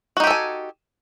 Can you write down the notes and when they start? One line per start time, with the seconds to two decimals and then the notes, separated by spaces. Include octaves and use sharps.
0.17 F#4
0.20 D#4
0.24 G4
0.27 A4
0.30 G#5